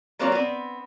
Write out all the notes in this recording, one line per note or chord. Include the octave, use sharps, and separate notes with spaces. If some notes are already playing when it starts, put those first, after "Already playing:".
F#3 A#3 C4 F4 C#5 D5
B3 C4